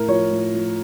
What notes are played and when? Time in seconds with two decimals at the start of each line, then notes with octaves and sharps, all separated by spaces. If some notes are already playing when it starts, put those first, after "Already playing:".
Already playing: A2 A#4
0.08 F3 C#5
0.31 A2
0.54 F3